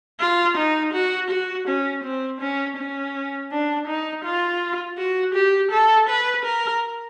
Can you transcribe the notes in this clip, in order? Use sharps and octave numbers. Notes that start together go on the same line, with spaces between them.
F4
D#4
F#4
F#4
C#4
C4
C#4
C#4
D4
D#4
F4
F#4
G4
A4
B4
A#4